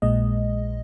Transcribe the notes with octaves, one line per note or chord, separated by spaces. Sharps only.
A#1 A#2 G#3 D#5